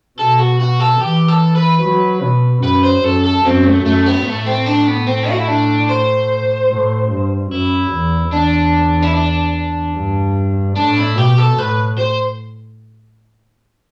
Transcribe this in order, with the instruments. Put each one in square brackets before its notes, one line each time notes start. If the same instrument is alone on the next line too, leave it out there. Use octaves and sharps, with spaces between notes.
[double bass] B2 [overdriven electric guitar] A4
[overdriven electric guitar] F#4
F#4
A4
[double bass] E3 [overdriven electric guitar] G4
[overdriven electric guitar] A4
B4
[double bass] F#3
B2
[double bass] F#2 [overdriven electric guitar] B4
[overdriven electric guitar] C5
[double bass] F#2 [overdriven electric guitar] A4
[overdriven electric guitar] A4
[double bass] F#2 [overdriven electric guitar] C4
[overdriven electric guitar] A3
[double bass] F#2 [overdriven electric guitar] A3
[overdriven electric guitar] B3
[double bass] A2 [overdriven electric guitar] A3
[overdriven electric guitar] C4
D4
B3
C4
F#4
E4
D4
C5
[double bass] A2
G2
[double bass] F#2 [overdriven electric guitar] E4
[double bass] E2
[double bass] E2 [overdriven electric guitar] D4
[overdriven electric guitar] E4
D4
[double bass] G2
[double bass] A2 [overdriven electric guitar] D4
[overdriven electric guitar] E4
[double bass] B2 [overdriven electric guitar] G4
[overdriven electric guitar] A4
[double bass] A2 [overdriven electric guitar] B4
[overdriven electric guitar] C5